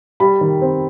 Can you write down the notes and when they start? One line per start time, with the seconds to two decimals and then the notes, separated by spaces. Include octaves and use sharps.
0.20 G3 B5
0.41 D#3
0.61 C4